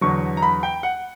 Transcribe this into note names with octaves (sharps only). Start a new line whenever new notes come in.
E2 D3 F#3 C#6
A#5
B5
G5
F#5